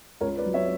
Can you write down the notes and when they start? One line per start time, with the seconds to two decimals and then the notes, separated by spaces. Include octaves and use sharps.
0.21 C#2 A#4 C#5
0.37 B4 D5
0.46 F#3
0.54 C#5 E5